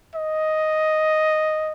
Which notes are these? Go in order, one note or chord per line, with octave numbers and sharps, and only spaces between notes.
D#5